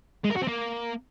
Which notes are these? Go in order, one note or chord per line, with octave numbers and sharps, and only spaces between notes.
G#3
A#4
F#4
C4
A#3